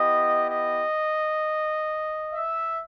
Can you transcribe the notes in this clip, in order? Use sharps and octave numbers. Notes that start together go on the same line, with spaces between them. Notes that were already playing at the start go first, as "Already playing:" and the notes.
Already playing: B3 E4 G4 D#5
D#5
E5